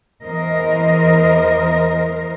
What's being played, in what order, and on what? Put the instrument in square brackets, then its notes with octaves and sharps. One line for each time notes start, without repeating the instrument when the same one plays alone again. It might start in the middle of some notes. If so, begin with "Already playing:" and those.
[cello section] E2 E3 A#4 C5 D#5